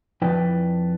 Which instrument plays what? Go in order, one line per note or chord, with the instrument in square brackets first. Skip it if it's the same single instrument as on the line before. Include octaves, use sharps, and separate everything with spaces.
[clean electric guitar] F2 F3 E4 B4 D5 G5